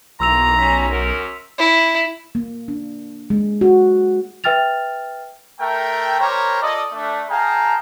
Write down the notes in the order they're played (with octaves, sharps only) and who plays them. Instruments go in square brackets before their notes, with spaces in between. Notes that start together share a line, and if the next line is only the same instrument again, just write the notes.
[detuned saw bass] B1 [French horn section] D#3 E3 A#3 [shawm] A#5 [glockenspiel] C6 E6 F7
[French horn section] B2 G3 C#4 [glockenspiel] E6 B6
[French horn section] F#2 A#4
[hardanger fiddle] E4
[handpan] A#3
D4
G#3
F#4
[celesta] B4 E5 G5 F6 A6 F7
[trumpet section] A3 A#4 G5
G3 G4 A#4 C5 C#5 A#5
F4 A4 D5 D#5
A3 D4
G#4 F5 G5 A5 A#5